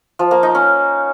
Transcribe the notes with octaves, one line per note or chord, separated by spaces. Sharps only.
F3
A#3
D#4
C#4